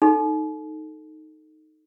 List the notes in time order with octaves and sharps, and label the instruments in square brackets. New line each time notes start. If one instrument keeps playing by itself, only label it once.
[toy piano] D#4 A4